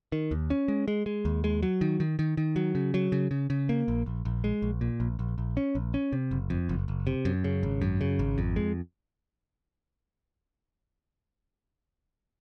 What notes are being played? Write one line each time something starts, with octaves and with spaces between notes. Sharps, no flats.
D#3
D#2
C#4
G#3
G#3
G#3
D#2
G#3
F#3
D#3
D#3
D#3
D#3
F#3
C#3
F#3
C#3
C#3
C#3
A#3
A#1
A#1
A#1
G#3
A#1
A#2
A#1
A#1
A#1
C#4
A#1
C#4
C3
F#1
F2
F#1
F#1
C3
F#2
C#3
G#1
F#2
C#3
G#1
F2
G#3